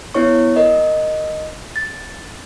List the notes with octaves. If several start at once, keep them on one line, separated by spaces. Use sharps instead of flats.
B3 E4 C#5 C#6
A#4 D#5
A6